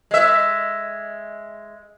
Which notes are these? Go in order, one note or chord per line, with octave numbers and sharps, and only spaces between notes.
G#3 E5